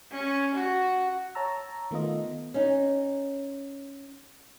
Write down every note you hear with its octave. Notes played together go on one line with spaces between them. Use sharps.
C#4
F#4
C#5 A5 A#5 E6
D#3 A3 B3 F4 D#5
C#4 D#4